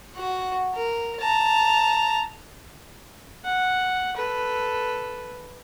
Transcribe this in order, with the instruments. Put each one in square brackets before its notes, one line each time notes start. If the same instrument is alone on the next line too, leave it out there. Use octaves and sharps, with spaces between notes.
[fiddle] F#4 F#5
A#4
A5 A#5
[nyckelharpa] F#5
A4 B4